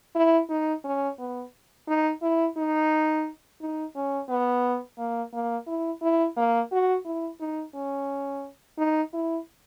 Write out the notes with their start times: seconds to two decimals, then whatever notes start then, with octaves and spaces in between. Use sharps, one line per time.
0.15 E4
0.50 D#4
0.84 C#4
1.19 B3
1.88 D#4
2.22 E4
2.57 D#4
3.61 D#4
3.95 C#4
4.29 B3
4.98 A#3
5.33 A#3
5.67 E4
6.02 E4
6.36 A#3
6.72 F#4
7.05 E4
7.40 D#4
7.74 C#4
8.78 D#4
9.13 E4